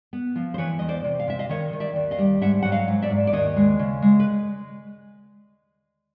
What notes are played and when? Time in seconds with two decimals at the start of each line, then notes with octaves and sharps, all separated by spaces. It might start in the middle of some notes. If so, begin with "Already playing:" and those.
0.13 B3
0.36 F3
0.54 C5
0.58 E3 B4 C#5
0.79 E2 D#5
0.89 C5 D5
1.04 C3
1.20 F5
1.27 C3 E5
1.39 D#5 F5
1.49 D#3 C#5 D#5
1.73 D#3
1.80 D5 E5
1.96 D#2
2.11 D#5 F5
2.19 G3
2.41 G#2 E5 F#5
2.63 F#3 F#5
2.72 D#5 F5
2.88 G#2
3.02 D5 E5
3.10 G#2
3.27 D5
3.33 D#2 C#5 D#5
3.56 G#3
3.79 C#3
4.02 G#3
4.20 B4